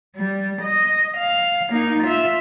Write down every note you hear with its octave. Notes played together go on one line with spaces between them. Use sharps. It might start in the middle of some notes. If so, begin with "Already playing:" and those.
G3
D#5
F5
A#3 D#4
F4 E5